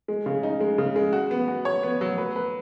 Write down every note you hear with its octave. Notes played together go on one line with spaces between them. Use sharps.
G#3
C#3
D#4
G#3
C#3
G#3
F#4
B3
F#4
C#5
B3
F#3
B4
B4